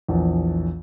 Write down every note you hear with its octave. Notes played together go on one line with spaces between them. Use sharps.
A#1 E2